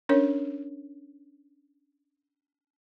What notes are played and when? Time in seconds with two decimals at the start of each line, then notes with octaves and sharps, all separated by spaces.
0.09 C#4 D4 A#4 C#5